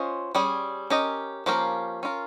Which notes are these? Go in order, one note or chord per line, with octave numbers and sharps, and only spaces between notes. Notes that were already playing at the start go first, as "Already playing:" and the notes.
Already playing: C#4 F4 C5 D#5
G3 C#4 G#4
C#4 G4 A#4 D#5
F3 A#3 C#4 G4 A#4
C#4 F4 A#4